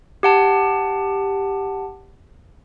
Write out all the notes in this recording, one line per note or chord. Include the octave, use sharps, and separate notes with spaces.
G4 F#5 A5